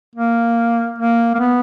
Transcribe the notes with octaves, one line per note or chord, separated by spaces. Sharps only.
A#3
A#3
A#3
B3